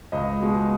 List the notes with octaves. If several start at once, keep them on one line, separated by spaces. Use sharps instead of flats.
C#2 D#5
B2 G#3